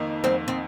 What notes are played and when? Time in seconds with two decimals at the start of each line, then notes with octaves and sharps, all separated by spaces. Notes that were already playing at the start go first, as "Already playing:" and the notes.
Already playing: F2 D#3 A#3 D#4
0.24 F2 G3 C4
0.48 C4